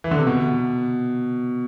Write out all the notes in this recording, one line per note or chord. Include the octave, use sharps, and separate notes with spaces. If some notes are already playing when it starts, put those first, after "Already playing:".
E3
D3
C3
B2